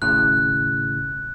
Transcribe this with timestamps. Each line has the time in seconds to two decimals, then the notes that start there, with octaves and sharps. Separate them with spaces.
0.02 G#1 A2 C#3 F#6